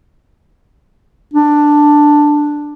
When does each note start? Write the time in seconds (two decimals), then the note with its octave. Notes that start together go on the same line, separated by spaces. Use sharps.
1.33 D4